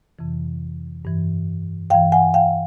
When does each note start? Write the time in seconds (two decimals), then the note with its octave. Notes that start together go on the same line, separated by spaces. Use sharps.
0.19 F2 C3 E3
1.05 G2 E3
1.90 G2 E3 F5 G5
2.12 F#5 G#5
2.34 F5 G5